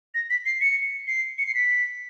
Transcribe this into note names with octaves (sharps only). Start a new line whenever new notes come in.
A#6
B6
C7
C#7
C7
C#7
C7
B6